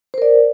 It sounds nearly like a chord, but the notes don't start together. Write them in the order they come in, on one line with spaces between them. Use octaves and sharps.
C5 A#4 D5